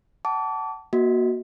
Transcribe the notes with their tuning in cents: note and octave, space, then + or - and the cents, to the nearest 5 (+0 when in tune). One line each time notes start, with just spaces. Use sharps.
F#5 +40 A5 +0 D6 -35
A#3 +30 F#4 +0 D#5 +0